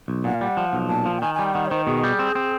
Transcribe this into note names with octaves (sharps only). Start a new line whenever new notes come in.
B1
A#2 F#5
F5
G3 F#5
F3
B1
A#2 A5
F3
G5
D#3 G#5
G3 G#5
G5
D#3 F#5
C#5
D#3 C5
B2 G#4
G3
C4
C4